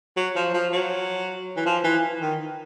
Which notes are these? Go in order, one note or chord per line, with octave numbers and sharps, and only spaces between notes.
F#3
F3
F3
F#3
E3
F3
E3
D#3